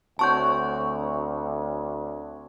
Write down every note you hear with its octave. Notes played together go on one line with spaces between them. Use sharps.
D2 C4 F#4 C#5 A5 C#6 G6